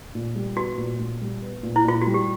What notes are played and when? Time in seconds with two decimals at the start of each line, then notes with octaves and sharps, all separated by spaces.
0.15 A#2
0.35 G3
0.56 B3 F#4
0.78 A#2
0.99 A#2
1.21 G3
1.42 B3
1.63 A#2
1.76 E4
1.84 A#2 F4
2.02 G3 F#4
2.14 G4